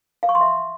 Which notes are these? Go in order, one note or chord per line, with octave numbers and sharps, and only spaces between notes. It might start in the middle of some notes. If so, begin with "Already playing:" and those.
F5
C#6
C6
E5